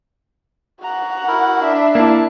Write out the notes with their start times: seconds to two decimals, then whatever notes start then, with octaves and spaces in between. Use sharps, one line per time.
0.84 F#4 F#5 A#5
1.28 E4 A#4
1.64 D4 E5
1.95 A#3 E4 A5